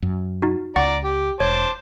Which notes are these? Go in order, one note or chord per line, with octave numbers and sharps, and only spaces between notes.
F#2
D#4 F#4
C#2 D5 F#5 A#5 C#6 A6
G4
E1 C5 C#5 A5 D6